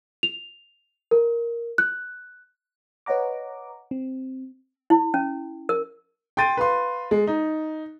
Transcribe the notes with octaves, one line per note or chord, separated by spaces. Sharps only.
F7
A#4
F#6
B4 C#5 D#5 F#5 A#5 D6
C4
E4
C#4
A#4
G5 C6 A6 D#7
B4 F5 C6
G#3
D#4